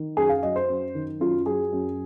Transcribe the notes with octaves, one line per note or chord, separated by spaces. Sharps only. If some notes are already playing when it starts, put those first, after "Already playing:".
Already playing: D#3
F#2 G#4
F5
F#3 D#5
C5
F#2
D#3
F#2 F4
F#3 G#4
F#2